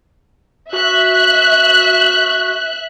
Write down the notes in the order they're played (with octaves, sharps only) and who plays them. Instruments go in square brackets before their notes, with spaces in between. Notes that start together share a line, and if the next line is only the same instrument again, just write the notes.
[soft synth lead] F#4 [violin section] E5 F#6